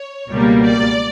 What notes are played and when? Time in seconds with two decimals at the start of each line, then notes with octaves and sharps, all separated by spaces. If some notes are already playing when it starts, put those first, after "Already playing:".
Already playing: C#5
0.29 C#2 B2 G3 A#3
0.62 D5